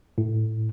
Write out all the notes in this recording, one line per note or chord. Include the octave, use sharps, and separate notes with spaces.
A2